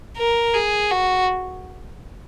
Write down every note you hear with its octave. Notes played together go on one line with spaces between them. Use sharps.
A#4
G#4
F#4